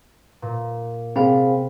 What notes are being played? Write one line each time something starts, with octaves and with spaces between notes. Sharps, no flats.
A#2
C3 C4 G#4 F5 B5